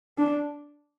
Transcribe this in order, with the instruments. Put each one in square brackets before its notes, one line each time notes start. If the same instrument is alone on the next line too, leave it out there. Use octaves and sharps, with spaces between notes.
[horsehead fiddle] D4